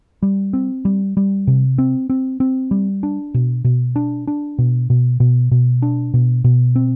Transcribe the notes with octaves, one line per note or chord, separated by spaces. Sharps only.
G3
C4
G3
G3
C3
C4
C4
C4
G3
D4
B2
B2
D4
D4
B2
B2
B2
B2
D4
B2
B2
C4